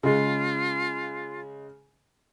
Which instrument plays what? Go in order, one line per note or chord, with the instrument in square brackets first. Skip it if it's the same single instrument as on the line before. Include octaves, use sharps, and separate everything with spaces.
[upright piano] C#3 G#3 [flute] F4